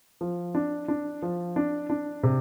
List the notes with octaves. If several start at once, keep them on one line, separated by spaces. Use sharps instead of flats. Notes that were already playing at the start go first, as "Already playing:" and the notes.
F3
D4
D4
F3
D4
D4
C3